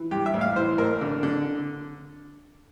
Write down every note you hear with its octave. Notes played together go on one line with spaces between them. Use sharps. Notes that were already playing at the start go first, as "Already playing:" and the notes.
Already playing: E3
G2 G4
E5
A1
F5
E3 C5
A1 A#4
D3
D3